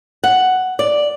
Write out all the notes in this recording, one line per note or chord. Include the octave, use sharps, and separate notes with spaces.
F#5
D5